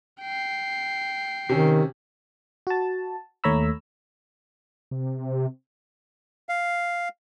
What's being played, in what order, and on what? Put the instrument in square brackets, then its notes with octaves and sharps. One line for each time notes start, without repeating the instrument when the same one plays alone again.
[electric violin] G5 C7
[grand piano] C3 C#4 [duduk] D#3
[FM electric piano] F#4 A5
D#2 A3 C#5 A#5 B5 E6
[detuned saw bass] C3
[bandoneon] F5